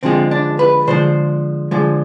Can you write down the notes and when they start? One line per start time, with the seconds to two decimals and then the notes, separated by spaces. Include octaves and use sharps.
0.03 D3 F3 G#3 C4
0.31 D4
0.59 B4
0.87 D3 F3 G#3 C5
1.71 D3 F3 G#3